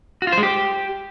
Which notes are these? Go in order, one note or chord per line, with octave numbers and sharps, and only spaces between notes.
F#4
F4
C5
G#3
G4